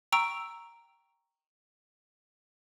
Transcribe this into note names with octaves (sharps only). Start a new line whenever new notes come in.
G5 A#5 C#6 E6 D7